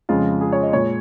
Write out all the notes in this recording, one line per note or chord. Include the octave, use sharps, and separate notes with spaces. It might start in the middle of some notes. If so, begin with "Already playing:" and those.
F2 C#3 G#3 F4
G#4
C#5
D#5
A#2 G#3 C#5